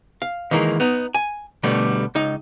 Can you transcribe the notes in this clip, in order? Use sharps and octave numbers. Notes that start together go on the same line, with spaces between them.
F5
D#3 E3 G#3 A#3
B3 D#4
G#5
B2 D3 G3 A3 B3
C#2 D#4